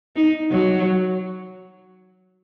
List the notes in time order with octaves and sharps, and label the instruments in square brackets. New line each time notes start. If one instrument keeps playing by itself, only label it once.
[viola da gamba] D#4
F#3